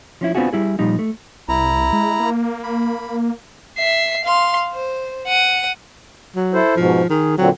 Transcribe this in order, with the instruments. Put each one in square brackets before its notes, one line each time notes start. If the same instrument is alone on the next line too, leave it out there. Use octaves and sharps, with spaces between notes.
[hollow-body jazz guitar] F3 C#4 E4
B3 C4 D4 F4 F#4 G#4
G3 E4 G#4
A#2 F3 G3 D#4
A3
[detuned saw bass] C2 [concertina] E4 A#5
[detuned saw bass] G#3
A#3
[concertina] B5
[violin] E5 C7
F5 C6
C5
F#5 D#7
[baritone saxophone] F#3
[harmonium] E4 A4 C5
[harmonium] G#2 B2 [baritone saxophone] F3
[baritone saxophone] D#3 [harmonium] G#4
[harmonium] A#2 D3 C4 [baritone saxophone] F#3